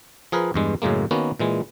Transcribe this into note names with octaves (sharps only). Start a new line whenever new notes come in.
F3 G#4 A#4 B4
E2 G2 G#3
F#2 A2 C#3 G#3 A#3
D#3 A#3 B3 C#4 F#4
A#2 E3 G#3